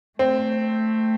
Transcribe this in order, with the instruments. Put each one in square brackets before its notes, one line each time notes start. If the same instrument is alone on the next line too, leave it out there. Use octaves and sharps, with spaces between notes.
[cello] A3 [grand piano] C4